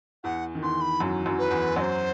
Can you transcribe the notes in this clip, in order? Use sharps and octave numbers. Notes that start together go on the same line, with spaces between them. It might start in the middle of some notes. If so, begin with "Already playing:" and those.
E2 E3 F#5
D#3
E2 E3 C6
B5
F#2 F#3
F#2 F#3
B4
E2 E3
F#2 F#3 C5 D#5